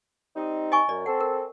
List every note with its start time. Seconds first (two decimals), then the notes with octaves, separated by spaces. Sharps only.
0.36 G3 C4 D#4
0.72 D#5 G#5 C#6
0.89 F#2 D5
1.06 C4 A4 F#5
1.21 A#4